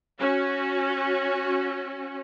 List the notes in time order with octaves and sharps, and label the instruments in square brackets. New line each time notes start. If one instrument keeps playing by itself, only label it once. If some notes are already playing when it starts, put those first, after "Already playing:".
[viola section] C#4 F#4